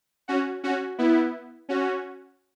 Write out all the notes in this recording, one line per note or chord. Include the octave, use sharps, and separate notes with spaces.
C#4 F#4
C#4 F#4
B3 E4
C#4 F#4